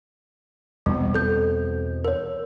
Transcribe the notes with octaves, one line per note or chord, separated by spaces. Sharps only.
E2 B2 G3 C4
A4 G6
A#4 C#5